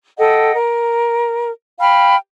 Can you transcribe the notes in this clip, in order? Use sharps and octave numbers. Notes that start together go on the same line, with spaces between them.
A4 D#5 F#5 G5
A#4
F5 G5 B5 F6